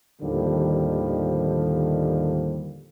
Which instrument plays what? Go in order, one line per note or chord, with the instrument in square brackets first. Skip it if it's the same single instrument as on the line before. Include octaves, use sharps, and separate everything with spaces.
[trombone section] D#2 A2 D3 D#3 F3 G3